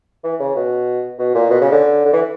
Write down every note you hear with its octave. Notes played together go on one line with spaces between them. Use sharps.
E3
C#3
B2
B2
A#2
B2
C#3
D3
D3
E3